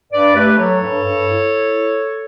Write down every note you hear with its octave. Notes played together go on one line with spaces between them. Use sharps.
G2 B4 D5
A3 G4 B4
F#3 A4 C#5
G2
G2
E4